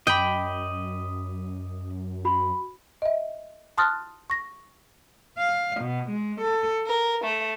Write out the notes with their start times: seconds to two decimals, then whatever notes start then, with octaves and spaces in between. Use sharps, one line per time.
0.07 F#2 D#5 G5 B5 D6 D#6
2.25 F#4 B5
3.02 D#5 E5
3.78 A5 C6 D#6 F6 F#6 A6
4.30 C#6 A#6
5.38 F5
5.80 B2
6.09 G#3
6.42 A4
6.86 A#4
7.24 A3